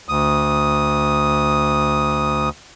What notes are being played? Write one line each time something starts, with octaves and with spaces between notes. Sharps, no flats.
D2 D#6